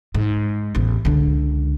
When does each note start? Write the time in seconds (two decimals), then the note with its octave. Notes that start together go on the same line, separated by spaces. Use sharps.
0.15 G#2
0.75 A1 E2
1.05 C#2 D3